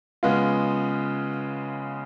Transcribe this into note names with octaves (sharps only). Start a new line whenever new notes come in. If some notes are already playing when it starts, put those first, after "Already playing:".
C#3 G#3 B3 F4